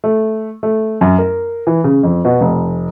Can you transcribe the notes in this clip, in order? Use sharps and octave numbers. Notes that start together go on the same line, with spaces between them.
A3
A3
F#2
A#4
E3
C#3
F2
B2
F1